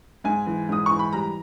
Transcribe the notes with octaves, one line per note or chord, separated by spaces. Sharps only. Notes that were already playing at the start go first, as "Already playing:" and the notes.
G#2 G#5
E3
G#2 D#6
E3 C#6
B5
G3 A#5